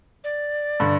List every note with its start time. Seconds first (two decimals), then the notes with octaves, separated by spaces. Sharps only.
0.24 D5
0.80 G2 D3